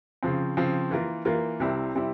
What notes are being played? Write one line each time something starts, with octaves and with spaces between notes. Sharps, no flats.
C#3 F3 C4
C#3 F3 C4
E3 A#3 F4 A#4
E3 A#3 F4 A#4
C2 C3 G3 C4 E4
C3 G3 C4 E4